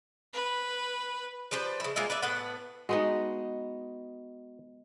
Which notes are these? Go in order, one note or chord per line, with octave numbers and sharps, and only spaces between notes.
B4
F3 G3 B4 C5
C#3 E4
G#3 A#3 F4 E5
B4 D5 E5
A2 B3 B4 F#5
G#3 B3 D#4 F#4